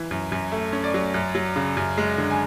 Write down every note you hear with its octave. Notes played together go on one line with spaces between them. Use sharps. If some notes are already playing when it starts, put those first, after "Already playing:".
Already playing: E3
F#2
F#2
A3
C#4
D5
F#3
F#2
F#3
C#3
F#2
G#3
D3
G#5